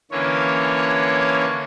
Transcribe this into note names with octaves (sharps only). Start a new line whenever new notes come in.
D3 E3 A#3 C#4 C#5